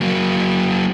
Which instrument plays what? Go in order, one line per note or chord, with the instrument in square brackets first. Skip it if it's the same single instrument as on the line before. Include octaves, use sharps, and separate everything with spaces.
[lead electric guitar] F#3 A#3